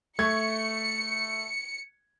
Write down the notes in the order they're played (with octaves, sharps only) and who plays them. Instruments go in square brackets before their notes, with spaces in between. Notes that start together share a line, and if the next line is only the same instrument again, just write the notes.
[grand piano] A3 C#6 G#6 [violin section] C#7